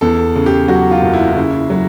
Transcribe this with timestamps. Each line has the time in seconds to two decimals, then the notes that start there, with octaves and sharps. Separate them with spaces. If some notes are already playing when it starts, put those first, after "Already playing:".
0.01 E2 A4
0.35 C#3
0.46 G4
0.68 F#3 F#4
0.91 F4
1.02 F#1
1.13 E4
1.36 C#3
1.70 F#3